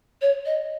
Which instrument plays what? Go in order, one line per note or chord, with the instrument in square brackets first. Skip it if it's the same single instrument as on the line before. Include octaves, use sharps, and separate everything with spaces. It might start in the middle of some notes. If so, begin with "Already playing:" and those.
[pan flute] C#5
D#5